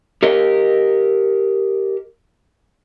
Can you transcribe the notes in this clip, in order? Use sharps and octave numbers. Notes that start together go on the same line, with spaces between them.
G4 A#4 D#5